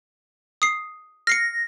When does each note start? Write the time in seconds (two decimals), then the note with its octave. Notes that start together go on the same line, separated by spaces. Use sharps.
0.62 D#6 C7
1.27 F6 A#6 C7 C#7